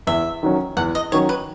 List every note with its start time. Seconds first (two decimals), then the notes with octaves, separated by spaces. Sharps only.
0.07 E2 E5
0.43 D#3 F#3 C#4
0.77 E2 F#5
0.95 D#5
1.12 D#3 F#3 C#4 C#5
1.29 B4